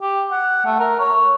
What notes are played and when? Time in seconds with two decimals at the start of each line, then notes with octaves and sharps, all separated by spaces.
0.02 G4
0.31 F#5
0.66 A3
0.79 A#4
1.00 C#5